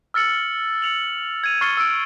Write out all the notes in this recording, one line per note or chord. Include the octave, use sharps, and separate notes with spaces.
E6 F6 A6 C#7 F#7
C#7 F7 F#7
G#6 D#7 F7
C#6 F6 A6 C7 C#7 G7
E6 D7